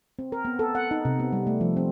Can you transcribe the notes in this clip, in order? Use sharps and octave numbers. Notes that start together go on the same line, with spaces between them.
C4
A#4
B3
A4
F#5
D#4
C3
B3
G3
A3
F3
C4